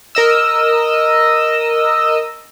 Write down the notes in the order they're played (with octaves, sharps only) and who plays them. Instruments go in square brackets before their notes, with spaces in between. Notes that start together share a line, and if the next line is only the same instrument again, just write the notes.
[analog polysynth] A#4 D#5 E6